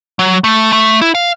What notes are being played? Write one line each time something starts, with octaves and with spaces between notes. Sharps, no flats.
F#3
A3
A3
E4
F5